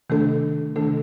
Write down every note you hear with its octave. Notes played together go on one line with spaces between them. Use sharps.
C3 D#3 A3 D4 A4
C3 D#3 A3 D4 A4